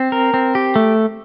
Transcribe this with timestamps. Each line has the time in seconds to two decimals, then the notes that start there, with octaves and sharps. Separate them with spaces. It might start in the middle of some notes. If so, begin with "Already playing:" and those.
Already playing: C4
0.12 A#4
0.34 C4
0.55 G4
0.76 A3